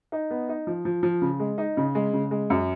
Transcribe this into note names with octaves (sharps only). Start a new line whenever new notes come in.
D#4
B3
D#4
F3
F3
F3
C#3
G#3
D#4
C#3
G#3
C#3
G#3
F#2